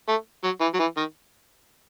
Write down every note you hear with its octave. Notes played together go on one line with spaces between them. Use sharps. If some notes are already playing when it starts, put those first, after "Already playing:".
A3
F#3
E3
F#3
E3
D#3